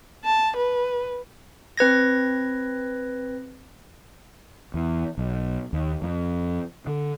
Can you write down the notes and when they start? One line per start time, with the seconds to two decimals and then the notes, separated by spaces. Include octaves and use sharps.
0.24 A5
0.56 B4
1.77 C4 B4 G#6 A#6
4.74 E2
5.18 B1
5.73 D#2
6.02 F2
6.87 D3